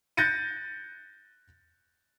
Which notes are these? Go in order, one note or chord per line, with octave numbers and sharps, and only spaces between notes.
F#6 G6 A6 A#6 C#7 D#7